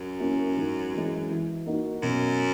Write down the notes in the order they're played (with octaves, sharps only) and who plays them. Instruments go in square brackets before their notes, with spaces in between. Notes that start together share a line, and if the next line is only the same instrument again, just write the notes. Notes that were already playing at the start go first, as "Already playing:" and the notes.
Already playing: [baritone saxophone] F#2
[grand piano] A#3 C#4 E4
G#2
E3 G#3
E3
A#3 D#4 F#4
[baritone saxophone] F#2 [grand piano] B2